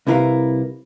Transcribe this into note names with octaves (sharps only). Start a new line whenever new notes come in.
C2 C3 E4 A#4 B4 F5